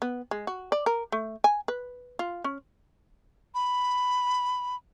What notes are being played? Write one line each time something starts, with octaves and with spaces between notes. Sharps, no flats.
B3
G#3
F#4
D5
A#4
A3
G#5
B4
F4
C#4
B5